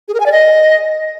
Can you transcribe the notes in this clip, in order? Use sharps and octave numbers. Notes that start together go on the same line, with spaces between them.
G#4
A#4
G#5
D5
D#5